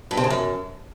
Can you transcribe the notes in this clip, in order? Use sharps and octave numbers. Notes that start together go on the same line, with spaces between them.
G2
C3
C#3
F#2